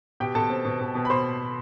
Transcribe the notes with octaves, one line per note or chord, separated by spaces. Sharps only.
B2 G4 G5
B2 A4 A5
C4
B2
B2
B2
B5
B2 C5 C6